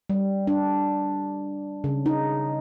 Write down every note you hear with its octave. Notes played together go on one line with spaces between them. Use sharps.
G3
D4
C#3
D#4